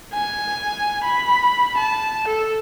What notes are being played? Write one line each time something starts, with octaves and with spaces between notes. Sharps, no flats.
G#5
B5
A5
A4